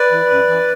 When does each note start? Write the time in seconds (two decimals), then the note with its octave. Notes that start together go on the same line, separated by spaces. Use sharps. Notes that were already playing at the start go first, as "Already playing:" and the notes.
Already playing: B4 D5
0.12 E3
0.31 F#2
0.49 E3